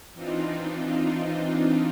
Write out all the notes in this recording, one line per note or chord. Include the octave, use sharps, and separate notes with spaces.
E3 C4 D4 D#4 F4